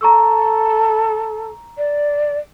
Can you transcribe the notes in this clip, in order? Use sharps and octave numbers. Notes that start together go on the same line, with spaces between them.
A4 A#5 C#6 E6
D5